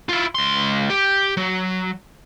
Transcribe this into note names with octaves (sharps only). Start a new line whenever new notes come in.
E4 F4
C#2 C6
G4
F#3